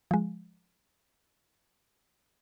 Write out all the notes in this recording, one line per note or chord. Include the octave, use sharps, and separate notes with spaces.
F3 G#3